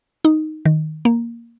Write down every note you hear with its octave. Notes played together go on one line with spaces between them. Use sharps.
D#4
D#3
A#3